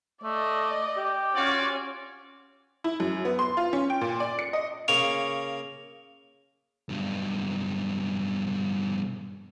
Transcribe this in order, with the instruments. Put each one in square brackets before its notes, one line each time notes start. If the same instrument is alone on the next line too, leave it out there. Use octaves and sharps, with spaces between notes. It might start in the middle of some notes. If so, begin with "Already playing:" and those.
[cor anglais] A3 [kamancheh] D5 D#5
[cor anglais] G4
[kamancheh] C#4 G#5 [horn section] F4 F#4 D5
[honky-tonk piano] E4
F#2
B3
C6
F4
C#4
G5
A#2
D5
C#7
D#5
[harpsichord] C#3 A#3 C#5 [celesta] F7
[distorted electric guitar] B1 G2